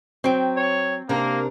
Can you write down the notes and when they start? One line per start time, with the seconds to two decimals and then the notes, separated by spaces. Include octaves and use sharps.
0.24 F#3 C4 G5
0.56 C#5
1.09 C3 A#3 D4 A#4